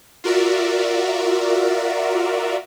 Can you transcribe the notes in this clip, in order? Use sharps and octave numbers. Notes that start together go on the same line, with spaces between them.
F4 F#4 A#4 D5 E5